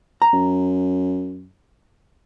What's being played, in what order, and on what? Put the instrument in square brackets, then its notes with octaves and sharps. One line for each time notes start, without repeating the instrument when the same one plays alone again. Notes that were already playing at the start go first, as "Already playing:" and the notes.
[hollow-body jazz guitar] A#5
[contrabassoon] F#2